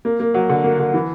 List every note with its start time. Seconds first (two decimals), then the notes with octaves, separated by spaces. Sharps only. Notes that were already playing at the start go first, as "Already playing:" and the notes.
0.05 A#3
0.20 A#3
0.34 F#3
0.50 D3
0.64 A#3
0.79 D3
0.94 E3